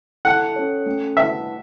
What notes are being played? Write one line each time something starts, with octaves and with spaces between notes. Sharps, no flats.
E4 A4 E5 F#5 A5
C#4 A4 C#5
A3 C#4 A4
A3 E4 B4 E5 F#5 A5